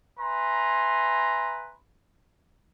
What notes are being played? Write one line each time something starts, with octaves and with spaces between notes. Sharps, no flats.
B4 E5 G#5 A#5 C6